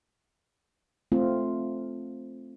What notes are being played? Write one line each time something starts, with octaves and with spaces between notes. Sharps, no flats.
A3 C4 F4